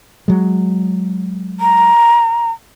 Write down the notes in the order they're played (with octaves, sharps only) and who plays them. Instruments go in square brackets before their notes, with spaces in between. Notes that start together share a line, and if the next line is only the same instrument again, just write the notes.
[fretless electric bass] F#3 G#3
[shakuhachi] A#5